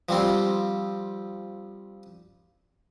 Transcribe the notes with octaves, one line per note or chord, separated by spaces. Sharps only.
F3 G3 C4